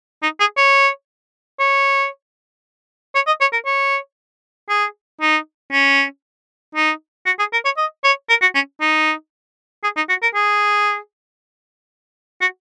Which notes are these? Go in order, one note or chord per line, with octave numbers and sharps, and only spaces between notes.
D#4
G#4
C#5
C#5
C#5
D#5
C#5
A#4
C#5
G#4
D#4
C#4
D#4
F#4
G#4
A#4
C#5
D#5
C#5
A#4
F#4
C#4
D#4
G#4
D#4
F#4
A#4
G#4
F#4